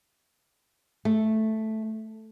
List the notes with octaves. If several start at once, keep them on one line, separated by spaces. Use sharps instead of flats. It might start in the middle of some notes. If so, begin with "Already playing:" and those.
A3